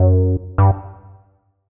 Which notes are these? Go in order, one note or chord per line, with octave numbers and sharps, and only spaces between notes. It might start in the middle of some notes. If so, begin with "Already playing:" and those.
Already playing: F#2
G2